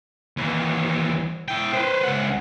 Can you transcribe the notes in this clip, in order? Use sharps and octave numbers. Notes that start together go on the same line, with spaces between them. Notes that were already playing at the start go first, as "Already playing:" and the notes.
D#2 E3
E4 G5
B4 C5
C#2 F#5